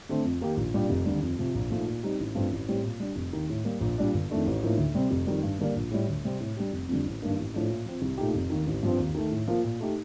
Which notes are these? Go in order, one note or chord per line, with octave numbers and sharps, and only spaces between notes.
D3 A3 C4
F2
D#3 A#3 D#4 G4
A#1
A#2 G3 D4 G4
F1
D#2 D3 G3
F2
C3 F3
A#1
A#2 F3 A3 D#4
A#2
G3 C4 D#4 G4
A1
G2 F3 A3 C4
A1
A2 G3 C4 G4
A#2
G3 D4 G4
F1
D#2 D#3
A2
G3 A#3
A#1
A#2 G3 D4
G1
F2 D#3 A3 D4
A1
A2 F3 A#3 D#4
D2
C3 G3 C4
F1
F2 D#3 G3
G2
D3 G3 A#3 D4
A#1
A2 G3
D2
C3 G3 C4
A2
G3 D4 G4
F1
F2 D3 G3
A1
G2 D#3 A#3 D4
A1
A2 F3 A3 D4
A#2
F3 C4
C2
A#2 A3 D#4 G4
F1
D#2 D#3
A1
G2 F3 C4
D#2
D#3 A3
A2
F3 A#3 F4
A#2
A3 D#4 G4